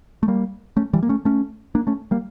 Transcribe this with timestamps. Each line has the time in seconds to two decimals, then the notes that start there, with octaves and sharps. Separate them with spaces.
0.23 A3
0.28 G3 A#3
0.77 A3 C#4
0.93 E3 G3
1.03 A#3
1.09 A3 C#4
1.25 A3 C#4
1.75 A#3 D4
1.87 A3 C#4
2.11 G3 A#3